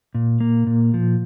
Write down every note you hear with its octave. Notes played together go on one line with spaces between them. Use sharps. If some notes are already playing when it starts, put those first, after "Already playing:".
A#2
A#3
A#2
F3